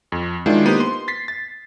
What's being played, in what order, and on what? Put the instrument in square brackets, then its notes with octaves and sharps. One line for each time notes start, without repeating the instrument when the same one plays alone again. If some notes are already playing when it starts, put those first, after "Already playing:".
[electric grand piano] F2
D#3 G#3 D4 E4 F4
A#3 B3 D#4 G4 B4 C5
C6
A6 B6 C7
A6